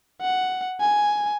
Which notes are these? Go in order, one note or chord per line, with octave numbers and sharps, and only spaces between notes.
F#5
G#5